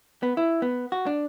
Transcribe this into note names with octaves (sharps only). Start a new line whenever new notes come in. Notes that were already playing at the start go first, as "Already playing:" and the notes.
B3
E4
B3
F#4
D4